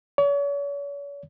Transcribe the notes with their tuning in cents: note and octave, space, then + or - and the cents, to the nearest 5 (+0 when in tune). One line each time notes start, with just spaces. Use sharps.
C#5 +40